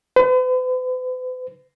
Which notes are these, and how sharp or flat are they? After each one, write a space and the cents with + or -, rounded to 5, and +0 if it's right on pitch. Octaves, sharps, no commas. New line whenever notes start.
B4 +45